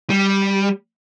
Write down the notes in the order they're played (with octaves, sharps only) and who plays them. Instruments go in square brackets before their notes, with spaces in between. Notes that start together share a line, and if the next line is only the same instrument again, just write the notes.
[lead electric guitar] G3